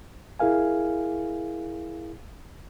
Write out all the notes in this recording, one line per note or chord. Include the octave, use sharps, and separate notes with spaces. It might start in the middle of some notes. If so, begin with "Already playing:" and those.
E4 G#4 A#4 F5 G#5